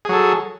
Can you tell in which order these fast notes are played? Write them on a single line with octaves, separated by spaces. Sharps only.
G#4 F#3 A4